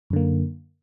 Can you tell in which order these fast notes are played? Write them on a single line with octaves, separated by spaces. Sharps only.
F#2 D3 A#3